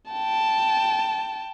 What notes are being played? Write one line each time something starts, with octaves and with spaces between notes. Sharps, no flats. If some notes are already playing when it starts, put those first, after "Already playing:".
G5 A5